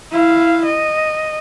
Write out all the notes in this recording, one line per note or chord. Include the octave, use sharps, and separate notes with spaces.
E4 F5
D#5